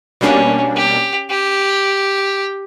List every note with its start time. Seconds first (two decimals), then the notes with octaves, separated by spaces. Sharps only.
0.21 B2 G3 A#3 C#4 D4
0.76 G4
1.30 G4